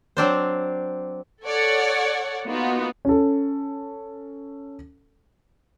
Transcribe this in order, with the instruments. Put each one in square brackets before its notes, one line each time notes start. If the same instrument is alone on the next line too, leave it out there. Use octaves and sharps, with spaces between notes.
[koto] F#3 C4 D4 C5
[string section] A4 C#5 D5 F#5
A#3 B3 D#4 F4 F#4
[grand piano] C#4 A4